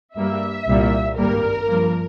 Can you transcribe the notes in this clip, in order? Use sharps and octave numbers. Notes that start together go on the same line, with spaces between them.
G2 G3 A#3 E5
C2 A#2 G3 A#3
G#1 G2 G3 A#3 A#4
G2 F3 A#3